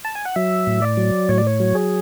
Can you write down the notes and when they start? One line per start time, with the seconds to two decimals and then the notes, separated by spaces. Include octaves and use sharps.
0.05 A5
0.15 G#5
0.25 F#5
0.36 F#3 E5
0.67 A2
0.82 D5
0.97 F#3
1.29 A2 C#5
1.38 D5
1.47 C#5
1.60 F#3
1.75 G#4